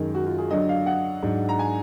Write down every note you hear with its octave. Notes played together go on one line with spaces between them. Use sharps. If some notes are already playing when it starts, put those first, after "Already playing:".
Already playing: F#2 D#3 G#3 D#4
F#4
F4
G#4
D3 F#3 D4 D#5
F5
F#5
G#2 F#3 D4
A#5
G#5